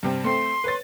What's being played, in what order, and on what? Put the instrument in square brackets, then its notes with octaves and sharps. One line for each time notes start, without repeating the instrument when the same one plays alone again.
[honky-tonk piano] G2 C3 C4
[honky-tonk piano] A3 C4 [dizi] C6
[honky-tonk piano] B4 C#5 A6